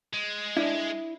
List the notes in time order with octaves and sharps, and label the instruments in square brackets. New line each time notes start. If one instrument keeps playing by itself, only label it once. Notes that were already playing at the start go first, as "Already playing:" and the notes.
[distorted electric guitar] G#3
[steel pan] D4 [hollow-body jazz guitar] E4